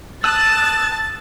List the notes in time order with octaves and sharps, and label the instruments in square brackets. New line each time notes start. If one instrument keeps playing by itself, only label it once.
[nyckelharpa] A5 [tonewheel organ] D#6 F#6 [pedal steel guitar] E6 [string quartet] A6